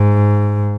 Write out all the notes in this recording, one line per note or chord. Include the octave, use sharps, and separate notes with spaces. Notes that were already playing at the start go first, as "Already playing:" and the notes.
Already playing: G#2